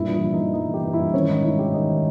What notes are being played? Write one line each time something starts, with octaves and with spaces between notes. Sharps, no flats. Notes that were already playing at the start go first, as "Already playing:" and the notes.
Already playing: G2 A#2 E4
E3
E4
E3
D#4
E3
G2 D#4
E3
G4
E3
E4
G2
D#3 C#4
G#2 D#4
G#2 E4
D#3 G4
D#3 D#4
D#3